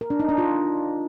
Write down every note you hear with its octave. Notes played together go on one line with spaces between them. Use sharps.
A#4
D4
D#4
D4
F4